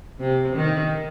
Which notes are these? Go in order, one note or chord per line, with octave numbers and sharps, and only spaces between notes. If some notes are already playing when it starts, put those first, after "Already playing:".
C3
D#3